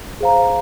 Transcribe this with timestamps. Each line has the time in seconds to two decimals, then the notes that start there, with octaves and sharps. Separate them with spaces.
0.20 G#4 C5 F5 A#5